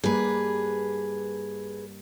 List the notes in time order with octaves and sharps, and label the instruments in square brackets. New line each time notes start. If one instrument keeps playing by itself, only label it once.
[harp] G2 A#3 [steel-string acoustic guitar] G#4 B4